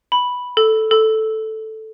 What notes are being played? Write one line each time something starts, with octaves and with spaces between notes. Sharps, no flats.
B5
A4
A4